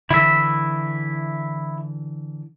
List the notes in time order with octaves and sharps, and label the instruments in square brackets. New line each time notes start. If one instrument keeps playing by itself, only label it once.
[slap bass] D3 E3 [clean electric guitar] E4 E5